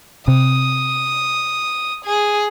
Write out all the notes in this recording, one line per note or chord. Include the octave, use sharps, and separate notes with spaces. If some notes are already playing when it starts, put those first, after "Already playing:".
C3 D#6
G#4